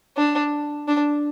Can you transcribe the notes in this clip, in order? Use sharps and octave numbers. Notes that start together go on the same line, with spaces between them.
D4
D4